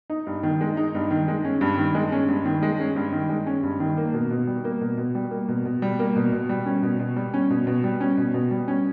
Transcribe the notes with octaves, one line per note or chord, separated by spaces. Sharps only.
D#4
G2
D#3
G#3
D#4
G2
D#3
G#3
C#4
G2
D#3
G#3
C#4
G2
D#3
G#3
C#4
G2
D#3
G#3
C#4
G2
D#3
A#3
B2
B2
G3
A#3
B2
B2
G3
A#3
B2
B2
G3
A#3
B2
B2
G3
C#4
B2
B2
G3
C#4
B2
B2
G3
C#4
B2
B2
G3
C#4